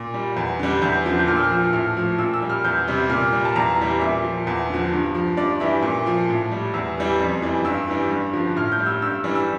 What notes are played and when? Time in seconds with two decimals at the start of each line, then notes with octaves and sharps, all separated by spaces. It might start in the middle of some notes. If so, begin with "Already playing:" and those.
Already playing: A#2
0.14 G3
0.36 E2
0.59 D3 G3
0.82 E2 G6
1.06 D3 F3
1.19 G6
1.27 A#2 F6
1.36 E6
1.43 F6
1.50 F3
1.73 A2 F6
1.97 F3
2.19 A#2 E6
2.34 E6
2.42 G3
2.49 F6
2.64 E2 G6
2.88 C3 G3
3.09 A#2 F6
3.32 G3
3.45 A5
3.55 E2 A#5
3.78 E3 G3
4.01 A#2 E5
4.24 F3
4.47 E2
4.69 D3 F3
4.92 G2
5.15 F3
5.37 G2 D5
5.60 E3 G3 E5
5.82 A#2
6.06 F3
6.29 A2
6.51 G3
6.74 E2 E6
6.97 E3 G3
7.19 F2
7.42 E3 G3
7.65 G2 E6
7.88 E3 G3
8.10 G2
8.33 D3 F3
8.56 A2 F6
8.72 G6
8.79 G3
8.86 E6
9.02 G2 E6
9.24 E3 G3
9.35 E6